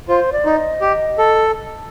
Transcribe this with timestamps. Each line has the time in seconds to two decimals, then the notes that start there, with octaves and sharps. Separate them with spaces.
0.08 F4 C5
0.33 D5
0.45 D#4
0.57 D#5
0.81 G4
1.18 A4